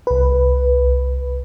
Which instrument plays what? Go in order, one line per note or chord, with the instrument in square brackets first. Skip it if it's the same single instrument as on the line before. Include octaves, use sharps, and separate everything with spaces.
[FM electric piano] C2 B4